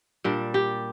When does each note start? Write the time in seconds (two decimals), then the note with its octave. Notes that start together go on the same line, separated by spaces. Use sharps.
0.24 A#2 G3 D4
0.54 G4